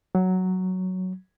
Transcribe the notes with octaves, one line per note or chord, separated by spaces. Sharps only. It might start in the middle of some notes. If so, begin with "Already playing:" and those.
F#3